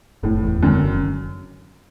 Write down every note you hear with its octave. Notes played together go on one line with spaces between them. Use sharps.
F#1 A2
E2
F#2 D3
F#1